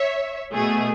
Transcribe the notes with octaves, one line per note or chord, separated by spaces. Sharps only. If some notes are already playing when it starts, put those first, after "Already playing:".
Already playing: C#5 E5
B2 A3 G#4